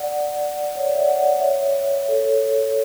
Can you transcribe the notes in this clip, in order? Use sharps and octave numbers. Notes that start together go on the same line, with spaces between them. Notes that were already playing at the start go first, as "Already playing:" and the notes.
Already playing: D5 F#5
C#5
D5
E5
D5 F#5
C#5 E5
A4 C#5